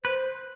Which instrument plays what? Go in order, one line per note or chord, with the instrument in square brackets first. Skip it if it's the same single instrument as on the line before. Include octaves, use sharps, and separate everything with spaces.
[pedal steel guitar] B4 [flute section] C5